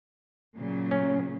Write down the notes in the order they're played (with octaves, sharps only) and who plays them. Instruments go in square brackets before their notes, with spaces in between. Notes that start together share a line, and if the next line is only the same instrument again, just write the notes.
[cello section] A#2 C#3 F#3
[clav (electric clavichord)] C#4